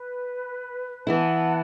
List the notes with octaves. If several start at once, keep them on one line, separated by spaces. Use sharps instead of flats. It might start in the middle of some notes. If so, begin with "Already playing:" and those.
Already playing: B4
E3 B3 E4 F#5 A5